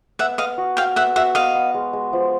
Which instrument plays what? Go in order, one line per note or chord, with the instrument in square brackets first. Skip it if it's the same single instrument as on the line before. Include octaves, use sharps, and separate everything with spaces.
[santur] B3 [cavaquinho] E5 F#5
[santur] B3 [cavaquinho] D#5 F5
[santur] F#4
[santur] F#4 [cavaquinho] F5 G5
[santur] B3 [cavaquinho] E5 F#5
[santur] F#4 [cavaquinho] E5 F#5
[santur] B3 [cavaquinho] D#5 F5
[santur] B3
G#3
G#3
F3